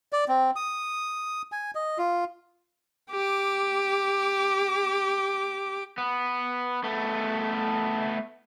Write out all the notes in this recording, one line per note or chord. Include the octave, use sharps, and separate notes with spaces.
D5
C4
D#6
G#5
D#5
F4
G4 D6
B3
A3 B3